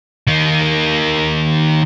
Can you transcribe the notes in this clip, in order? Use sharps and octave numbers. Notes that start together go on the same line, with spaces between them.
D#3 A#3